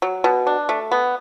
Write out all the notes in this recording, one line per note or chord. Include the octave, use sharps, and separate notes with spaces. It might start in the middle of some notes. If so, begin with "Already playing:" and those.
F#3
B2
D4
A3
B3